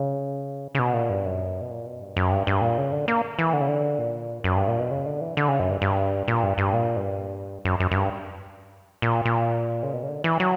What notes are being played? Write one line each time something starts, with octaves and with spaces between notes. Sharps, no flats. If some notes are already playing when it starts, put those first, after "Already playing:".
Already playing: C#3
C#3
B2
A#2
G2
F#2
B2
A#2
B2
G2
F#2
G2
G2
A#2
C#3
D3
A#3
E3
D3
C#3
D3
A#2
F#2
G2
A#2
B2
C#3
D3
E3
D3
C#3
F#2
G2
G2
A#2
G2
G2
A#2
G2
F#2
F#2
F#2
G2
A#2
A#2
C#3
B2
C#3
D3
E3
F#3